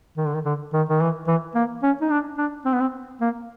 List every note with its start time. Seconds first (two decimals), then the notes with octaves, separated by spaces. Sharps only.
0.17 D#3
0.27 D3
0.34 D#3
0.45 D3
0.73 D#3
0.89 D#3
1.01 E3
1.28 E3
1.55 A#3
1.83 C#4
2.01 D#4
2.11 D4
2.38 D4
2.65 C4
2.74 B3
2.81 C4
3.21 A#3